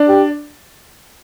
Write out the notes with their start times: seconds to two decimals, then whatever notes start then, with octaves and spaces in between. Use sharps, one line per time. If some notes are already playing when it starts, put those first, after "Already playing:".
Already playing: D4 D5
0.08 G4